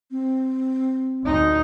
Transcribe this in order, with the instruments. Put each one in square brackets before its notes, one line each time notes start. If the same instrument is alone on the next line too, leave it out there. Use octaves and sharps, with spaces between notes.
[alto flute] C4
[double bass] D2 D#4